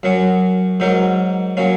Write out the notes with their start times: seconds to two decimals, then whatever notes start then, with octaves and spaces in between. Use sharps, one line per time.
0.03 F#2 F#3 C#4
0.80 G#2 F#3 D#4 A#4
1.57 F#3 A#3 C#4